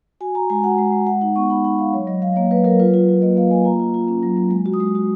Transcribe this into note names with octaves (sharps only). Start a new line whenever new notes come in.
F#4 G#5
F#4 A#5
G#3 G#5
F#4 F#5
G#3
G#3
G#3 F#5
D#4 F#5
B3 C#6
D#4 B5
D#4 F#5
G#3 F5
F#3 C#5
F#3 D#5
F#3 F5
A#3 C#5
F#3 B4
F#3 A#4
F4 B4
F4
F4
A#3 D#5
A#3 F5
A#3 G#5
F4 A#5
F4
F4
C#4
F#3
F#3
G#3
F#4
D#6
G#3
F#4